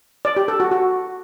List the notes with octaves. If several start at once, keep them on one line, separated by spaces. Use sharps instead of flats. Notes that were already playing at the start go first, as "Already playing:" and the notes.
D5
G4
A4
F#4
F#4